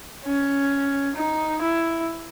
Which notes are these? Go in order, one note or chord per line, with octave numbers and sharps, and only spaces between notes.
C#4
D#4
E4